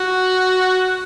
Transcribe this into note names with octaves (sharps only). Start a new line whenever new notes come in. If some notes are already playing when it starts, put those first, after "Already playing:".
Already playing: F#4